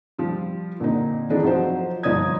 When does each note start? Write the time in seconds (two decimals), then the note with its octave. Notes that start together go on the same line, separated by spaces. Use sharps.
0.18 F3 G3 F4
0.80 A#2 D3 C4 D#4
1.30 E3 C4 D4 D#4 G#4 A4
1.43 F3 F#3 D#4 C5
2.03 G1 F3 D#4 D5 D#6 G#6